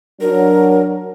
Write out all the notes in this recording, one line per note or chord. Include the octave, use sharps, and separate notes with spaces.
F#3 D4 A#4